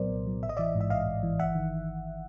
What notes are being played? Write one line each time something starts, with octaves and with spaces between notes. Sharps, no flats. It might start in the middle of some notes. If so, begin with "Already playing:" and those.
Already playing: C2 A#2 F#3 B3 A#4 C5 D5
C2
F#3
A1 E5
D#5
E3 D5 E5
G#2
E5
A1 D#5 F5
A1
E3
G1 E5 F#5
D#3